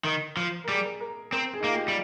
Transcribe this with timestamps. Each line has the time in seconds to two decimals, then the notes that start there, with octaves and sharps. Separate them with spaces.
0.04 D#3 A#4
0.37 F3
0.64 A#4
0.68 G3 G#4
0.84 A#4
1.00 A#4
1.32 C4 A#4
1.53 G#4
1.60 D#4
1.64 A#3 F4
1.74 G4
1.88 G3 F4